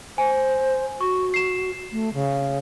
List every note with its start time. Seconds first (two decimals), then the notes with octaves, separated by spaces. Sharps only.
0.18 C5 G#5
1.01 F#4 C#6
1.34 C7 E7
1.92 A3
2.14 C#3